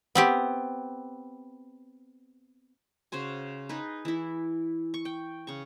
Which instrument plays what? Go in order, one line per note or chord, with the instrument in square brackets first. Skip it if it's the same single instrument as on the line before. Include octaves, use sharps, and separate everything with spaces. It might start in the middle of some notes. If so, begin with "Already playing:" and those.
[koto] B3 C4 G4
[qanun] C#3 F#4 C5 G#5
D#4 G#4 B4
E3 E4
C#6
G5
C#3 C#6